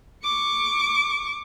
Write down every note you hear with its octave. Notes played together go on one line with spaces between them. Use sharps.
C#6 D6